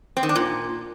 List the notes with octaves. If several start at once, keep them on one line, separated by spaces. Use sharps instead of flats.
C4
D#3
D4
A#2